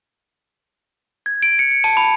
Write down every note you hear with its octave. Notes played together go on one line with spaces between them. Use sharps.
G#6
D7
C#7
C#7
A5
B5